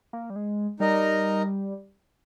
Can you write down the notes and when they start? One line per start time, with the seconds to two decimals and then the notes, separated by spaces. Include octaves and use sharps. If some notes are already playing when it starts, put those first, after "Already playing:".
0.13 A#3
0.30 G3
0.36 G#3
0.80 G3 D#4 A#4 D#5